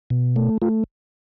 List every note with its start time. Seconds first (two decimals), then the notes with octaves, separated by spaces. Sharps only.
0.10 B2
0.36 A3
0.62 A3 F4